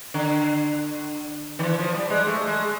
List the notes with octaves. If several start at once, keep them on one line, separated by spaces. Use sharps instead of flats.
D3
D#3
E3
F3
G3
G#3
A3
G#3